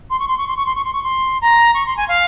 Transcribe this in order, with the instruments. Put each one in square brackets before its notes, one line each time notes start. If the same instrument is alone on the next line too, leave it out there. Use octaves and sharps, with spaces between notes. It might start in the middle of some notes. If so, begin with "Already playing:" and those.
[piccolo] C6
C#6
C6
C#6
C6
C#6
C6
C#6
C6
C#6
C6
A#5
C#6
C6
G#5
F5